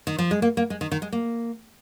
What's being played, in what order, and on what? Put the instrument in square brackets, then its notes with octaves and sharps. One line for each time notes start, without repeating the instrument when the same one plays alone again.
[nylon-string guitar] D#3
F3
G#3
A#3
A#3
G#3
D#3
D#3
G#3
A#3